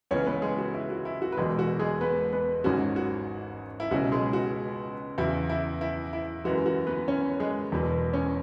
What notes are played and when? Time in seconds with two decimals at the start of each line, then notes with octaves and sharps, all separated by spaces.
0.11 C#2 C#3 E3 B3 C#4 C#5
0.27 B3 B4
0.42 G#3 G#4
0.58 F#4
0.74 E4
0.90 F#4
1.05 E4
1.22 F#4
1.32 B4
1.37 E1 E2 B2 G#3 G#4
1.59 F#4
1.79 G#3 G#4
2.01 B3 B4
2.32 B3 B4
2.64 G#1 G#2 F#3 C#4 F#4
2.96 F#4
3.80 E4
3.91 C#2 B2 F#3 C#4 F#4
4.12 G#3 G#4
4.33 F#4
5.18 E2 C#3 F#3 E4
5.49 E4
5.81 E4
6.13 E4
6.44 F#2 E3 G#3 F#4
6.66 F#4
6.87 B3 B4
7.08 C#4 C#5
7.40 G#3 G#4
7.72 E1 E2 B2 F#3 B3
8.13 C#4 C#5